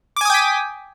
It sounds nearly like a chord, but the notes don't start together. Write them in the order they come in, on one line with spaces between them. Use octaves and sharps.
D6 G#5 D#6 G5 B6